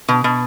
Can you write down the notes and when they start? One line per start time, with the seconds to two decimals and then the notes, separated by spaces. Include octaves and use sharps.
0.08 B2
0.24 B2